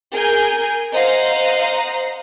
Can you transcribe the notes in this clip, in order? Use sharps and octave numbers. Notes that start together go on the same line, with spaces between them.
G#4 A#4 G#5 G6
C5 D#5 F5 F#5 A#5